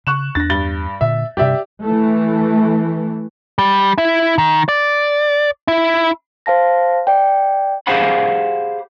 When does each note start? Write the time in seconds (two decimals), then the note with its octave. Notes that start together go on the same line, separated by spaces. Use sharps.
0.07 C#3 C#6 F#6 E7
0.35 E2 D4 A6 A#6
0.50 G2 A6 G7
1.01 A#2 D3 E5
1.37 G2 C3 G4 D5 E5
1.84 E3 A3
3.59 G3
3.98 E4
4.38 D#3
4.69 D5
5.68 E4
6.46 C5 F5 A5 A#6
7.07 D5 G5
7.87 G4 G#4 C5 F5 F#5 B5